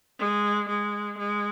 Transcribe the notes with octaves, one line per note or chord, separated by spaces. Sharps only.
G#3
G#3
G#3